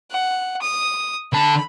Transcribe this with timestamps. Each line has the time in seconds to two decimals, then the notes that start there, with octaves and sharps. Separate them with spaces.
0.11 F#5
0.62 D#6
1.33 D3 A5 B5